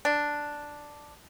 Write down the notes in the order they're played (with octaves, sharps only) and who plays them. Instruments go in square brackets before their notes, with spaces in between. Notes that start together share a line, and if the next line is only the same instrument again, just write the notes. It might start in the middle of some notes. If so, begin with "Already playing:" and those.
[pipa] D4